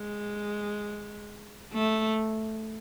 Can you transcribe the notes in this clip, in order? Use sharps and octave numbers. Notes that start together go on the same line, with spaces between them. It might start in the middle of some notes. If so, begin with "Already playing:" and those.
Already playing: G#3
A3